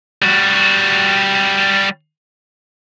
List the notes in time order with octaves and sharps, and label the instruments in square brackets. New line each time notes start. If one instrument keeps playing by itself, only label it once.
[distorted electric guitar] G3 F#4